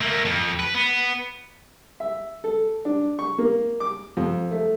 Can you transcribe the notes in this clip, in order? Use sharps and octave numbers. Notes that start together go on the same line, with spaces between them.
A3 A#3
F2
B4
B3
E5
A4
D4
C#6
A#3
D6
F2
A3